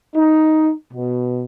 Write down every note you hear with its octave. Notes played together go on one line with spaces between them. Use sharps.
D#4
B2